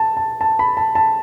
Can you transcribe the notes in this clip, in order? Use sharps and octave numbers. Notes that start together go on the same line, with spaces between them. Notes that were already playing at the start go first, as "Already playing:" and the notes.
Already playing: A5
A5
A5
B5
A5
A5